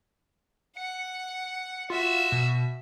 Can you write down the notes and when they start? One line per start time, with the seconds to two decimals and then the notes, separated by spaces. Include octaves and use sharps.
0.77 F#5 C#7
1.90 F4 F#4 E5
2.32 B2